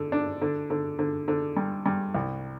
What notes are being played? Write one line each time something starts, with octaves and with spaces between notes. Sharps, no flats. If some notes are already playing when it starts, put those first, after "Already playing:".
Already playing: D3
D4
D3
D3
D3
D3
G2
G2
C2